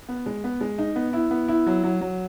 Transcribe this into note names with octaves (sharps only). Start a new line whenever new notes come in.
B3
G#3
B3
G#3
D#4
B3
E4
B3
E4
F#3
F#3
F#3